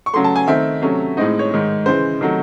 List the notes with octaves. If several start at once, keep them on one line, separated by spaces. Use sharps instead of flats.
C#6
C#3 F#3 A3 C6
A5
G#5
D#3 A3 C4 E5
C3 F#3 A3 C#4
A2 G#3 C4 D#4 D#5
C#5
G#2 D#3 G#3
C#3 E3 G#3 C5
C3 D#3 F#3 A3